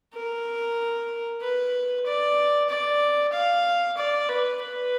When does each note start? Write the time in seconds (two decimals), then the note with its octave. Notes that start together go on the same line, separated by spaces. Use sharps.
0.14 A#4
1.41 B4
2.05 D5
2.69 D5
3.33 F5
3.97 D5
4.29 B4
4.61 B4